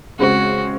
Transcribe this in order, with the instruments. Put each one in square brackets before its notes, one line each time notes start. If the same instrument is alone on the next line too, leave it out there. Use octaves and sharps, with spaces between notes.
[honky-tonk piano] C#3 G#3 C4 [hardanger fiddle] F#4